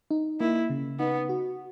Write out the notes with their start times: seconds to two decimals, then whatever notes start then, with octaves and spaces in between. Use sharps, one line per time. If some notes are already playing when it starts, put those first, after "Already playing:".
0.11 D#4
0.40 A#3 E4
0.70 C#3
0.99 B3 D#4
1.29 F#4